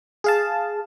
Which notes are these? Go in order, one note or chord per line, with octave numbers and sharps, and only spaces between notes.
G#4 F5 A5